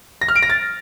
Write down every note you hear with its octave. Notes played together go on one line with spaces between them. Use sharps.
A#6
F6
D7
A#6
A6